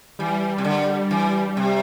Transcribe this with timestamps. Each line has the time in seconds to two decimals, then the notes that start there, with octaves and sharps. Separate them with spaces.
0.19 E3 G3
0.58 C3
0.65 D3
1.11 E3
1.57 C3